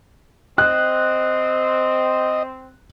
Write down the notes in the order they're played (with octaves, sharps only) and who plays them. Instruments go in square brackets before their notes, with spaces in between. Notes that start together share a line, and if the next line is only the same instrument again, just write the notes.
[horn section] C4 [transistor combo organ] D#5 [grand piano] F#6